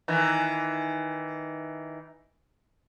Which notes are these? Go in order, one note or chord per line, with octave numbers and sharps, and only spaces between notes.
D#3 E3